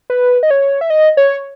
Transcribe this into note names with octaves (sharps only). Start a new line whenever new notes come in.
B4
D#5
C#5
E5
D#5
C#5